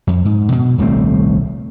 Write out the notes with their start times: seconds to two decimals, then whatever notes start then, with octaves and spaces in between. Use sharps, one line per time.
0.07 F2
0.25 G#2
0.52 B2
0.78 D#1 C2 A3 C4